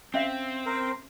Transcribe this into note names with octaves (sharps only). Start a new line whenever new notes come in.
C4 C#4 E5 F5
A#4 C5